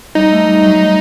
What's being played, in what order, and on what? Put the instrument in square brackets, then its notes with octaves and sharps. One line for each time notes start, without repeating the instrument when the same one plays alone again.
[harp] G3 [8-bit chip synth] D#4
[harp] A3
G3
F#3
G3